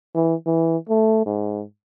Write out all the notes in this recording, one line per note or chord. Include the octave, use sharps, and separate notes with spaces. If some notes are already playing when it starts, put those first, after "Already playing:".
E3
E3
A3
G#2